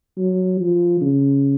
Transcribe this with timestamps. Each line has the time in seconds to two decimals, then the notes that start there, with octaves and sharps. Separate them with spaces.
0.18 F#3
0.60 F3
1.01 C#3